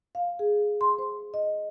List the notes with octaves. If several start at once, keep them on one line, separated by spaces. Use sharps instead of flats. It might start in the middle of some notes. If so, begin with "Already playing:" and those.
F5
G#4
C6
C5
D#5